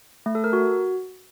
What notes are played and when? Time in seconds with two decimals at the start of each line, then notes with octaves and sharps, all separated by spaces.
0.26 A3
0.35 A4
0.44 A#4
0.53 F#4